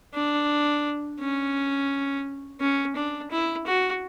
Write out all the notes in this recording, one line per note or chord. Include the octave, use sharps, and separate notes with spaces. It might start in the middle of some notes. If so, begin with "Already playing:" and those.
D4
C#4
C#4
D4
E4
F#4